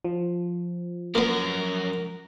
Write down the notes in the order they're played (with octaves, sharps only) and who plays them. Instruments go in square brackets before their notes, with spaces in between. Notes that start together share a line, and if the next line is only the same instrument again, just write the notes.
[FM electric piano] F3
[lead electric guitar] F#2 [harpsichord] A#3 B3 [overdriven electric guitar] A#4